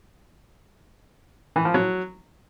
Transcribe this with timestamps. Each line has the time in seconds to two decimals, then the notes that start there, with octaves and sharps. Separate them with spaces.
1.56 E3
1.65 F3
1.74 F#3